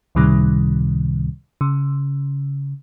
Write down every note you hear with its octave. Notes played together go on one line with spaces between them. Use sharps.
C#2 A2 C3 D#3 G3
C#3